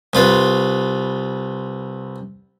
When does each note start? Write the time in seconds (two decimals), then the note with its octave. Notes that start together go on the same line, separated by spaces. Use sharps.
0.13 C2 F4 B4